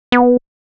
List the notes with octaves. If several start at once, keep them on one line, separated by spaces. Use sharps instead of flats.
B3